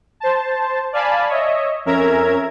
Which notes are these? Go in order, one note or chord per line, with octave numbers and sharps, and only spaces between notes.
C5 A5
D5 F5 G#5 A5 B5
C#5 D#5 E5
F2 C#4 A#4 E5 A#5 G#6